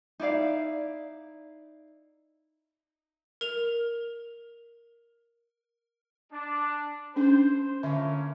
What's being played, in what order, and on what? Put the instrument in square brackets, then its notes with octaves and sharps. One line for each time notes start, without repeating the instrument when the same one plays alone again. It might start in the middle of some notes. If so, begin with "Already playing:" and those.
[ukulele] D#4 E4 D5 F5
[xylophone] A#4 F7
[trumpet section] D4
[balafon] C#4 D4 [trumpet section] C5
[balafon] D3 E5 [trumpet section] A3 A#3 C#4